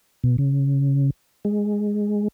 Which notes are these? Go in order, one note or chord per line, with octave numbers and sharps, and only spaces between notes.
B2
C#3
G#3